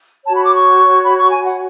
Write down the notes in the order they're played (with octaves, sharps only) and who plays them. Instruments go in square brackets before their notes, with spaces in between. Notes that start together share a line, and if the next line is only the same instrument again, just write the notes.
[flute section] F#4 C#5 A5
B5
D6
C#6
B5
C#6
G#5
F#5